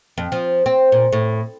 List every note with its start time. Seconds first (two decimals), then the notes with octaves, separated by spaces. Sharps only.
0.18 F2
0.32 F3
0.66 C4
0.92 A#2
1.13 A2